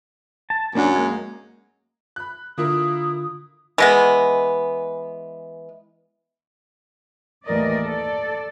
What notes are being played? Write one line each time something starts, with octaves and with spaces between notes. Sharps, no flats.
A5
F#2 A#3 D4 F#4
G#3 A#3
B5 F#6
D3 A#3 E4 F4 A#4 D#6
E3 G#3 B3
D#2 A2 E3 A#4 D5 D#5
A4 D5